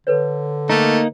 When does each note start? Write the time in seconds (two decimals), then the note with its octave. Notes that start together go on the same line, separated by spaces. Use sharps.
0.07 D3 A4 B4 C#5
0.70 A3 A#3 D#4